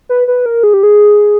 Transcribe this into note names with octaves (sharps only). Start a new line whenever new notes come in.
B4
B4
A#4
G#4
G4
G#4